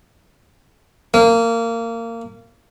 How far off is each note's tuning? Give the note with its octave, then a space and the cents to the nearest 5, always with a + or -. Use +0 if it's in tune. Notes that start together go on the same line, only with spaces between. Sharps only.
A#3 -20